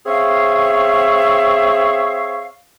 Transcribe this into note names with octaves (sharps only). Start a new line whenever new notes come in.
C4 G#4 C#5 E5 F5